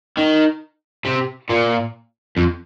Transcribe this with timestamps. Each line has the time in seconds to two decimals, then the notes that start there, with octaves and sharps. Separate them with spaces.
0.17 D#3
1.05 C3
1.49 A#2
2.37 F2